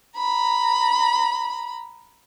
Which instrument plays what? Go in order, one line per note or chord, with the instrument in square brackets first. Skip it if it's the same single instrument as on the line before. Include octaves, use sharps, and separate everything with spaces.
[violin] A#5 B5